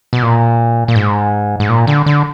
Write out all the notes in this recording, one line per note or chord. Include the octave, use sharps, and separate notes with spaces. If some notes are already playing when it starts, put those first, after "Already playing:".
B2
A#2
A#2
G#2
G#2
A#2
D3
D3